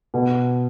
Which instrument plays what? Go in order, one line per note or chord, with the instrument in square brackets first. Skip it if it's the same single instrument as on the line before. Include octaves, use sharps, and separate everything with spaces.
[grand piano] B2